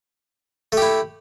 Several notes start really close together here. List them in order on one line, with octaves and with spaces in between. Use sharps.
A3 G4 E4